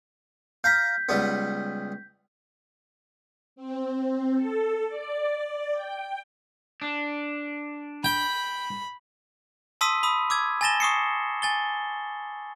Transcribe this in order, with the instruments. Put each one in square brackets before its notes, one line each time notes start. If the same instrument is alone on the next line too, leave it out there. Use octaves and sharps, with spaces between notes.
[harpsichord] F5 A#5 [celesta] G6 B6
[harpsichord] C#2 G3 B3
[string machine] C4
A4
D5
G5
[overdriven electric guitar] D4
[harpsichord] G5 [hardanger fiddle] B5
[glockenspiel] A5 C6 D#6 E6 B6 D#7
B5 D#6 E6
D6 E6 G#6
G#5 A5 A6 A#6 E7 G7
C#6 D#6 C7 C#7
G#5 A6 G7